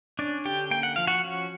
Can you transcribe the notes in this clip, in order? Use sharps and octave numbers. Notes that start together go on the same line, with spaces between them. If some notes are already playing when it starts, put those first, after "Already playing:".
C#4 D4 D5
D3 G4 G5
A#3 G5
F#5
F3 F5
F#4 F#5
C#4